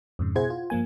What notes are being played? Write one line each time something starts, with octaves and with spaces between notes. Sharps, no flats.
F2 G#2 C#3
B2 E4 G#4 C5 F#5 G#6
F4
G2 F3 A#3 G#5